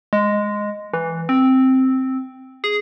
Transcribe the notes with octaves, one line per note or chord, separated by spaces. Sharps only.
G#3
E3
C4
G#4